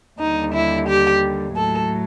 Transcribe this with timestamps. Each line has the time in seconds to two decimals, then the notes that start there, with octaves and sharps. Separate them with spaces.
0.20 D#2 D3 G3 D#4
0.54 E4
0.88 G4
1.56 A2 F#3 A4